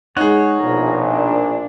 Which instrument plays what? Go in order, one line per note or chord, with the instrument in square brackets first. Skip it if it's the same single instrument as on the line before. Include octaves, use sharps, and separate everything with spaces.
[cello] G#3 [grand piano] D#4 G#4 [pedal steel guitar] C#5 F#5
[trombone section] A#1 [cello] B2 A#4
[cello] D4